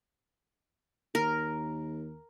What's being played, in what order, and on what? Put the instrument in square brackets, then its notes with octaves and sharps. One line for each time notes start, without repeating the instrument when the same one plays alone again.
[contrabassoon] D#2 [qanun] A#4